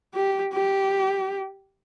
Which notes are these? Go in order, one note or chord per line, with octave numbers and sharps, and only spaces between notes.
G4
G4